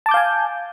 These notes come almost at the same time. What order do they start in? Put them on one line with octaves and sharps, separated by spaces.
A5 D6 G6 F5 G#5